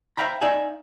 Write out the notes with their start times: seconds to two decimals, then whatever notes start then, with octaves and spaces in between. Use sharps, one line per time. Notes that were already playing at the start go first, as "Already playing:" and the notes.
0.17 C5 E5 F5 G5 A#5 B5
0.41 D#4 D5 E5 F5 G#5